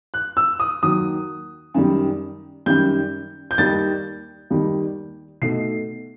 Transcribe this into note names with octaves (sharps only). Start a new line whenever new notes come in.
F#6
E6
D#6
D#2 D#3 F#3 D#6
F#2 D#3 G3
F#2 D#3 G3 G6
G6
D#2 D#3 G3 D#4 A6
D#2 D#3 G3 D#4
B2 A3 D#4 C7